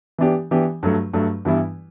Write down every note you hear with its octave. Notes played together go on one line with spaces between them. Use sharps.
E3 B3 D4 G4
E3 B3 D4 G4
G2 F#3 A3
G2 F#3 A3
G2 E3 G3 B3 E4